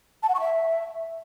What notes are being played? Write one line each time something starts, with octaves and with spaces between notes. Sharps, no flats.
A5
F#5
C#6
E5